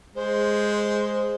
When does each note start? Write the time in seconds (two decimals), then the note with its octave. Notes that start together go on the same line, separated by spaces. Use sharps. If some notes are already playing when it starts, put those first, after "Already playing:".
0.15 G#3 C5